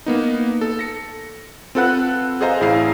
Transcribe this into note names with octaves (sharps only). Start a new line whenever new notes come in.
A#3 B3 D#4
A4
A#6 C#7
C4 F4 A4 B4 F#5 F#6
G#4 A4 C5 D#5 F5 A#5
A1 E4 G#4 F5 C7